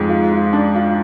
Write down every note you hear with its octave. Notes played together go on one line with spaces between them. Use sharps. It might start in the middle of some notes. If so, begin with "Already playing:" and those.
Already playing: F2 G#2 G#3
F4
F4
D4
F4